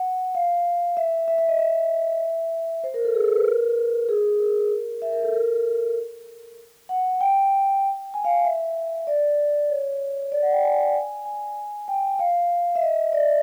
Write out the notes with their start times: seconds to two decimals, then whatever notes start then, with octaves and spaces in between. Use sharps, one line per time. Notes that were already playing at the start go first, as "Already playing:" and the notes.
Already playing: F#5
0.35 F5
0.97 E5
1.28 E5
1.38 E5
1.49 D#5
1.59 E5
2.84 C5
2.94 A#4
3.05 A4
3.15 G#4
3.25 A4
3.36 B4
3.46 A#4
4.09 G#4
4.39 A#4
5.02 E5
5.12 A#4
5.23 A4
5.34 A#4
6.89 F#5
7.21 G5
8.14 G#5
8.25 F5
8.45 E5
9.07 D5
9.70 C#5
10.32 D5
10.43 F#5
10.52 G5
10.63 G#5
11.25 G#5
11.88 G5
12.19 F5
12.75 E5
12.82 D#5
13.13 D5